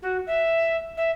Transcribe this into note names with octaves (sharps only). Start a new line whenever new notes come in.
F#4
E5
E5